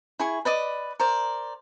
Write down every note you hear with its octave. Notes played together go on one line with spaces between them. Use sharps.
E4 G#4 C#6
B4 D5 D#5 D6
A#4 C5 D5